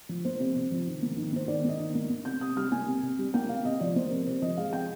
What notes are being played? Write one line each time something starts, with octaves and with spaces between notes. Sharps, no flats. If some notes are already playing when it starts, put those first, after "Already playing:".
F3
A#3 C5
C3
C3
F3
D#3
A#3
D#3
A#3 C5
D#3 D5
A#3 D#5
D#3
A#3
A#3
C3 G6
C3 D#6
G3 F6
A#3 G#5
C3
C3
G3
A#3 G5
C3 F5
C3 D#5
F3 D5
A#3 C5
C3 A#4
C3 C5
F3 D#5
G#3 F5
C3 G5